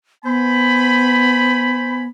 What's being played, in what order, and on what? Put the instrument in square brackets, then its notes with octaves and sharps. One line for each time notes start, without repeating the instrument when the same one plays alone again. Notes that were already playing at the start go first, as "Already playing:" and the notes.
[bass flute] B3 [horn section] C5 G#5 B5